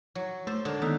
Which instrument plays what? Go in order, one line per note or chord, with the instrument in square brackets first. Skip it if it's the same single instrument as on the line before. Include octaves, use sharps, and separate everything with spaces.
[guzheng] F#3
[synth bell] A3 [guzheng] C5
[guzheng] D3 A#4 [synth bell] G#3
[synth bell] D#3 B3 E6 [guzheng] D#4